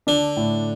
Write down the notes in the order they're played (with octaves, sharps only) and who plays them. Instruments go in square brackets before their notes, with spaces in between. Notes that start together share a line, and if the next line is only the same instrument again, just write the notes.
[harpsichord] D3 [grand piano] D4
[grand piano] A2